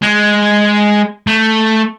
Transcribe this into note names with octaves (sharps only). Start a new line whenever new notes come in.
G#3
A3